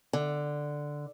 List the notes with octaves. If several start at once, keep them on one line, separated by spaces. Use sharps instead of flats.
D3